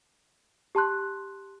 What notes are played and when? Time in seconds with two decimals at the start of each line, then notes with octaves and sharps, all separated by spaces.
0.75 G4 A5 C6 F#6